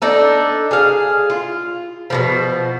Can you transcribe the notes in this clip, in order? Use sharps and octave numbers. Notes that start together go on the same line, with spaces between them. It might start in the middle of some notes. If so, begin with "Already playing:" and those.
D4 D#4 A4
G#4 F5
F4
B2 D3 F3